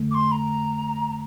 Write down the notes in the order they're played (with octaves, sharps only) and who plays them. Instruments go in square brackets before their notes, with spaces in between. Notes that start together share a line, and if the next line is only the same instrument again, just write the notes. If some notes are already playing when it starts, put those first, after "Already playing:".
Already playing: [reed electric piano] F2 D3 A3
[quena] D6
C6
A#5